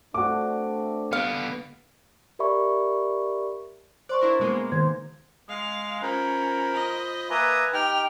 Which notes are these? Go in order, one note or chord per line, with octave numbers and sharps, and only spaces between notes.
A3 C4 D4 F#4 D6
D3 B3 F5
G4 A#4 D5 E5 B5 C#6
C5 D5 C6 C#6
D4 E4 A#4
B2 G#3 A#3
D#3 C5 G#6
G#3 F5
C#4 F4 A#4 C5 B5
D#5
A#3 B4 E5 G#5 A#5 D#6
D#4 G4 G5 F6